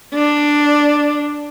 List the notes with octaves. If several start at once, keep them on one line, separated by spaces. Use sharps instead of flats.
D4